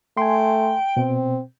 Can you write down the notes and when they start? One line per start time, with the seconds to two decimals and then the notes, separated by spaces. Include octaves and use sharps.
0.17 A3 G5 G#5 C6
0.97 B2 C4